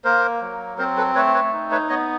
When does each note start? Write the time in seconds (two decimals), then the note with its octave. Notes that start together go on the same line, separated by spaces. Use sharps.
0.05 A#3 A#4 C5
0.42 F#3
0.78 C4 A#4 C5
0.97 A4 B4
1.15 A3 B4 C#5
1.34 B4 C#5
1.53 D#4
1.71 B4 C#5
1.89 B3 C#5 D#5